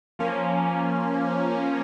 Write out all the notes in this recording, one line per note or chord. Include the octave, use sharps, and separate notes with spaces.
F3 A#3 C#4